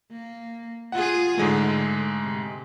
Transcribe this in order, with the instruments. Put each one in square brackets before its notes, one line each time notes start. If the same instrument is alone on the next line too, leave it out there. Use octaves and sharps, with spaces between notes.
[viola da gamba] A#3
[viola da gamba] F4 G#4 [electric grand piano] F#5
[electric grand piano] G#2 G#3 A3 [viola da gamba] D3
[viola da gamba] C3